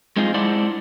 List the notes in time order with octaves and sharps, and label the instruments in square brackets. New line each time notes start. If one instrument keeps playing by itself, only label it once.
[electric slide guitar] G#3 C4 D#4 F4 G#4
G#3 D4 E4 C5 D5 F#5